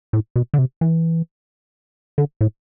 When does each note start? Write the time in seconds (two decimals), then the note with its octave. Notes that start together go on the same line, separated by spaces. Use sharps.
0.13 A2
0.36 B2
0.54 D3
0.58 C3
0.81 E3
2.18 D3
2.41 A2